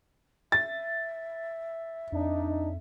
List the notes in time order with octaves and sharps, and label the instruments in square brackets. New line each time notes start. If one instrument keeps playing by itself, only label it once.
[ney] E5 [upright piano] A6
[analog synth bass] F2 [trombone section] D4 D#4